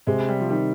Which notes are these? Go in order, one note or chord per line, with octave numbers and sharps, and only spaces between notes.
C3 G#3
G3
F3
D#3 G3